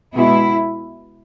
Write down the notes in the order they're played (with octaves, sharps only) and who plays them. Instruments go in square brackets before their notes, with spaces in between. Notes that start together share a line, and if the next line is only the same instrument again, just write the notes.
[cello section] B2 G#3 B3 E4